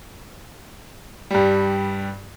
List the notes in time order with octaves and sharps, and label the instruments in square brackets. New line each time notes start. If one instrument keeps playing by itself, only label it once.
[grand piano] G2 G3